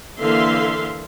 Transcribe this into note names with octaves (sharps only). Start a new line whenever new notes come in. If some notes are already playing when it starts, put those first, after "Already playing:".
D3 E3 A#3 E5 F5 C6